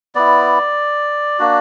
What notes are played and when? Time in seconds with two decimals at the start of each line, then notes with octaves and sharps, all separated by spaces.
0.15 B3 E4 D5
1.39 A#3 D4 F#4